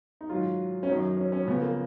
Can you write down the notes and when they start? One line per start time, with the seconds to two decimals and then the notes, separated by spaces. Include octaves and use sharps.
0.21 D#4
0.29 G#2 D#3 F#3 F4
0.83 C#4
0.88 F#2 D#3 F#3 D#4
1.17 C#4
1.32 C#4
1.47 F2 C#3 F3 B3
1.62 A#3